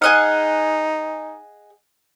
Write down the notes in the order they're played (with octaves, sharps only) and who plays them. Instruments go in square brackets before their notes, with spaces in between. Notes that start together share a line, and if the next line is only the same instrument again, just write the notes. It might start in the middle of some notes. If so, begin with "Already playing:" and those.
[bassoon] D#4 [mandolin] G#4 D#5 F#5 [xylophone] F6 F#6